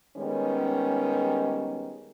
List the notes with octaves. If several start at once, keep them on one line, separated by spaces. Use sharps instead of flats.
D#3 G3 G#3 B3 C#4